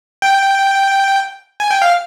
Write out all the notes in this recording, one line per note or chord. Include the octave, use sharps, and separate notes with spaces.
G5
G#5
G5
F5